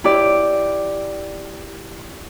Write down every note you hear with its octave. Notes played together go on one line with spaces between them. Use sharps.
E4 G4 D5